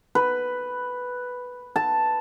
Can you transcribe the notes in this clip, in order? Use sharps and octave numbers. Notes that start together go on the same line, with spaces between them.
B4
A5